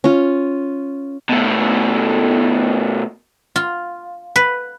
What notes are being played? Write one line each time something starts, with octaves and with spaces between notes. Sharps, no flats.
C#4 F4
B2 A3
F4
B4